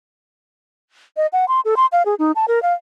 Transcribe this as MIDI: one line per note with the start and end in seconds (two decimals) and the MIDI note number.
1.17 1.27 75
1.33 1.45 78
1.48 1.60 84
1.65 1.75 69
1.77 1.86 84
1.92 2.03 77
2.06 2.15 68
2.19 2.32 63
2.36 2.45 81
2.48 2.62 70
2.62 2.73 77